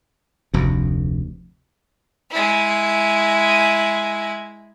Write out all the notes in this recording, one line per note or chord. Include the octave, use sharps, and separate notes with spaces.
F1 D2
G#3 E4